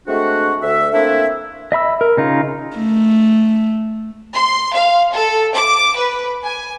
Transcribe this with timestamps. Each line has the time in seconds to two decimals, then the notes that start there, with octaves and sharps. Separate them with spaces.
0.07 G#3 A3 C4 D4 F#4
0.62 D2 E5
0.93 A3 A#3 C4 D4 E4 E5
1.72 D#5 E5 B5 E6
2.01 A#4
2.17 C#3 D#4 F4
2.76 A3
4.33 C6
4.73 F5
5.12 A4
5.55 D6
5.96 B4
6.44 G#5